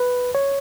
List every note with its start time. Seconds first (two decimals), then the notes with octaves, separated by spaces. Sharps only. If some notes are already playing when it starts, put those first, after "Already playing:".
Already playing: B4
0.35 C#5